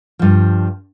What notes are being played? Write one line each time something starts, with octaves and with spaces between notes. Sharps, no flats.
G2 F3